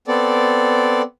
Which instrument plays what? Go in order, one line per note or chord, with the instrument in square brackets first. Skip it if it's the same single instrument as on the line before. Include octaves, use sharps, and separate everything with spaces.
[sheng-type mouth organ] B3 C4 A4 D5